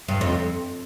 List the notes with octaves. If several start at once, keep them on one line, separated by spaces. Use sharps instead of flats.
G2
F2